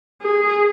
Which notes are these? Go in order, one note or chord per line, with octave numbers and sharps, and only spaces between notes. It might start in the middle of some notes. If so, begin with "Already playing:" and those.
G#4